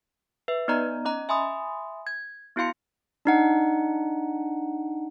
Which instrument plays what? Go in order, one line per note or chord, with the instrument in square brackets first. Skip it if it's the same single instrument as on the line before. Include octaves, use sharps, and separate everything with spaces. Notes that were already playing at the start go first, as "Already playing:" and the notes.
[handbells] B4 E5
B3 D#4 D5 D#5 A#5
C#4 D#5 A#5
E5 G#5 B5 C6 D#6
G#6
B3 E4 F#4 F5 C6 C#7
D4 D#4 F#5